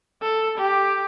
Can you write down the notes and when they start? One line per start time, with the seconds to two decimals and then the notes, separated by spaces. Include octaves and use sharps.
0.22 A4
0.57 G4